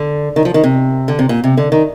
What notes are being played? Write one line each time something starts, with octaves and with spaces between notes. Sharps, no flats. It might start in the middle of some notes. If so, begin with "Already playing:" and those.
Already playing: D3
D#3
F3
D#3
C3
D3
C3
A#2
C3
D3
D#3